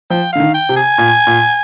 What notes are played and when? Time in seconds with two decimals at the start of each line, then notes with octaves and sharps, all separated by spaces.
0.10 F3 G5
0.33 D3 F5
0.40 D#3
0.54 G5
0.69 C3
0.76 G#5
0.98 A#2
1.27 A#2